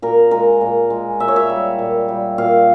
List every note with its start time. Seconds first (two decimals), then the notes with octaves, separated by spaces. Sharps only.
0.02 A#2 A#4
0.31 G#3 A#4
0.61 A#2
0.90 G#3
1.20 A#2 E5
1.28 C#5
1.36 E5
1.50 G3
1.79 A#2
2.09 G3
2.38 A#2 F5